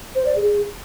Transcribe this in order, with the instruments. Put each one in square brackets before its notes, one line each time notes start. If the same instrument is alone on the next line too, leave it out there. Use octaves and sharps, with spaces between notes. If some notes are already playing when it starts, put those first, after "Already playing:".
[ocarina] C5
D5
G#4